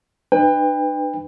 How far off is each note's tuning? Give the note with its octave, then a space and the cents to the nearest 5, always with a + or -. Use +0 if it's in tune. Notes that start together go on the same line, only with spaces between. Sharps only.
D4 +40 B4 +15 G5 +35